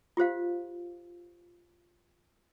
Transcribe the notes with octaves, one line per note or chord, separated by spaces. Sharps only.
F4 G4 C5 F5